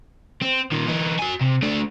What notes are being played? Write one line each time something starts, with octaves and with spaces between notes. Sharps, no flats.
C4
A#2 D#3
E3 D#4
F#4 G#5
C3
A3 D4